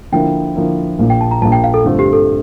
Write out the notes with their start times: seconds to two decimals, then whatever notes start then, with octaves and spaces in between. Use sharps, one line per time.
0.12 D3 F3 A#3 E4 G5
0.56 D3 F3 A#3 E4
0.99 A#1 A#2 F3
1.10 G5
1.21 A5
1.31 A#5
1.42 A#1 A#2 F3 A5
1.52 G5
1.64 F5
1.74 A4
1.84 G2 D3 A3 C4 F4
1.99 G4
2.13 A4